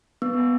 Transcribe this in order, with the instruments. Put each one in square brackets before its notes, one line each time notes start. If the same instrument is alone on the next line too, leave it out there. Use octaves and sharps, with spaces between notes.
[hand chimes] B3